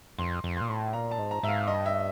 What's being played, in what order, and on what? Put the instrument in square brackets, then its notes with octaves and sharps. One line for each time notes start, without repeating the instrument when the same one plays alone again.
[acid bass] F2 [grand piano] C6
[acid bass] F2
[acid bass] A#2 [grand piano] C6
[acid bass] A2
[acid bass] A#2 [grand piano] A#5
[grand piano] A5
[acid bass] G#2
[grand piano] A#5
[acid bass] G#2 [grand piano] E5
[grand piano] F5
[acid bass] G2 [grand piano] D#5
[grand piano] E5